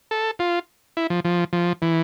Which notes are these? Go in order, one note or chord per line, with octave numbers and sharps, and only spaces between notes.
A4
F4
E4
F3
F3
F3
E3